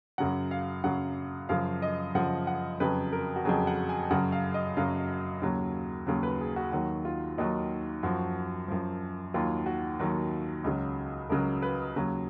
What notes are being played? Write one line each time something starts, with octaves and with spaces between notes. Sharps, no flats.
F#2 C#3 F#3 F#5
F5
F#2 C#3 F#3 F#5
F#2 C#3 F3 F5
D#5
F#2 C#3 F3 F#5
F#5
F2 C#3 F#3 B4
A#4
F#4
F2 C#3 F#3 G#4
F#5
G#5
F#2 C#3 F#3 F#5
F5
D#5
F#2 C#3 F#3 F5
D#2 C#3 F#3
D#2 C#3 F#3
B4
G#4
F#4
D#2 D#3 F#3 F#4
F4
D#2 D#3 F#3 D#4
F#2 F3 F#4
F#2 F3
D#2 D#3 F#3 F4
F#4
D#2 D#3 F#3
C#2 C#3 F#3
C#2 C#3 F#3 A#4
B4
D#2 C#3 F#3